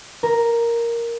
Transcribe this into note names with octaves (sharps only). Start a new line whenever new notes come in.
A#4